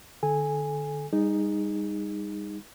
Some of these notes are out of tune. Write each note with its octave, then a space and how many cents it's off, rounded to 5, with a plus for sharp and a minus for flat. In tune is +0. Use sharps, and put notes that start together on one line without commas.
D3 +25 A4 -30 G#5 -10
G3 +35 D#4 +0 G#4 -15